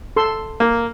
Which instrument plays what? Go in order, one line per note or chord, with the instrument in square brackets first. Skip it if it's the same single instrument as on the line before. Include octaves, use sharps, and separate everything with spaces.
[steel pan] A4 C6 E6
[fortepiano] A#3